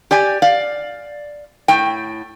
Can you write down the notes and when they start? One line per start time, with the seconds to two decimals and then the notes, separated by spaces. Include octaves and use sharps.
0.11 G4 D5 G#5
0.42 D5 F5
1.68 A2 G5